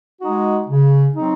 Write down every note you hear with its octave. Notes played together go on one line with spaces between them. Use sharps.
G#3 D#4 F#4
C#3
F#3 C4 D#4